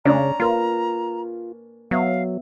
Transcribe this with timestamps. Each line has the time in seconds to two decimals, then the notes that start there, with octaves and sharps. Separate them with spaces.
0.05 C#3 C#4 D4 A#5
0.40 A#3 F4 A#4 B4
1.91 F#3 B3 E5 F5